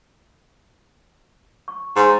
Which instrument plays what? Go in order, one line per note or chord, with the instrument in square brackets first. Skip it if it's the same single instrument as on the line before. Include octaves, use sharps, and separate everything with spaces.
[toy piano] C#6
[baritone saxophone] G#2 [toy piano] C6